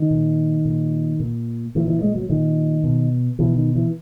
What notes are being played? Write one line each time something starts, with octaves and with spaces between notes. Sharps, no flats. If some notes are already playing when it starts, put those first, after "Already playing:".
Already playing: D#3
A#2
A#2
A#2
A#2 E3
E3
G#3
F#3
A#2 D#3
B2
B2 E3
D#3
E3